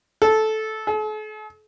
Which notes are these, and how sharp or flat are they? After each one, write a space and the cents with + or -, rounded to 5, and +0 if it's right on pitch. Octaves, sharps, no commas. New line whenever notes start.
A4 -10
A4 -45